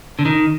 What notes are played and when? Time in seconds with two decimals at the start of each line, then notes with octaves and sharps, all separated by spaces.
0.19 D3
0.25 D#3